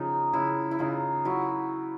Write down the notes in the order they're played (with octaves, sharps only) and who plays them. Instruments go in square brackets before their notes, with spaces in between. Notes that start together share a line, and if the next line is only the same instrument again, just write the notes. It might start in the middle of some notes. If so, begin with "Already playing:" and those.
Already playing: [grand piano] C#3 F3 [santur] D#4
[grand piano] C#3 [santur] E4
[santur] E4
[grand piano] C#3 [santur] D#4 F4
[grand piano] F#3 [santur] E4 F#4